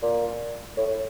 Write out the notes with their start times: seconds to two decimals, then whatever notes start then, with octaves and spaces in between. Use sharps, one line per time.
0.02 A#2
0.77 A2